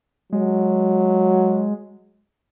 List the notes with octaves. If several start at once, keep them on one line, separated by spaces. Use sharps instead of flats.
F#3 G#3